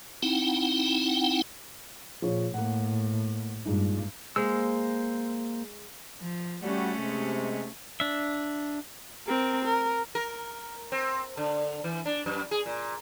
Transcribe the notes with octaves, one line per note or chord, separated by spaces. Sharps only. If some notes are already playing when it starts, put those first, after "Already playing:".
C4 D#4 E4 F#5 G5
A#2 F3 G#4 C#5
A2 A#3 F#5
G2 A#2 G#3 D#4
G#3 A#3 C5 E6
F3
G3 A3 C#4 F#4
C3 G#3
D4 E5
C4 A#4
A#4
A#4
C4
D3
E3
D4
F#2
G#4
A#2